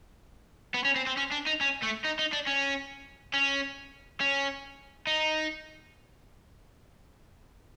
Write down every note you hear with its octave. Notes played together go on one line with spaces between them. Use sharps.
B3
C#4
C4
C4
C#4
D4
D#4
C#4
A3
D#4
D#4
D4
C#4
C#4
C#4
D#4